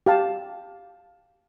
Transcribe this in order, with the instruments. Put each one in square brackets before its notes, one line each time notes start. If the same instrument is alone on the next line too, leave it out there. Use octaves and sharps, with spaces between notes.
[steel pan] G4 F5 A5